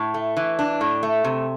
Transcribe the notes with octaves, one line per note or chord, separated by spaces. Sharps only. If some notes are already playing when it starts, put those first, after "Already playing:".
Already playing: A2
A3
E3
D4
A2
A3
C3